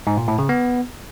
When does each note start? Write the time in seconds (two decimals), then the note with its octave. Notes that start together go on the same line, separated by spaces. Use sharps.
0.07 G#2
0.17 A#2
0.28 A2
0.39 C#3
0.49 B3